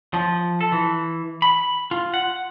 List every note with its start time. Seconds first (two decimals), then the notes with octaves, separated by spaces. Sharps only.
0.14 F3
0.61 A4
0.72 E3
1.42 B5
1.91 F4
2.14 F#5